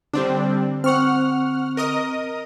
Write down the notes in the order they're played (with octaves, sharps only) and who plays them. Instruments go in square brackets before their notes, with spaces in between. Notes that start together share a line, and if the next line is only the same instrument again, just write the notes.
[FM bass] D3 [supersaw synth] G3 C4 D4
[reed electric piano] C4 C#6 [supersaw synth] F#5 F6
[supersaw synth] A#4 D#5 D#6